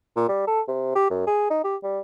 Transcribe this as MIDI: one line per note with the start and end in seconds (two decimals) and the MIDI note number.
0.16 0.28 46
0.29 0.43 55
0.47 0.61 69
0.68 0.93 48
0.95 1.08 67
1.10 1.25 42
1.27 1.48 68
1.50 1.60 63
1.64 1.76 67
1.83 2.00 55